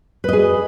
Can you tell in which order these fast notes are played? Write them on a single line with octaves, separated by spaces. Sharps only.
B4 D#5 G#4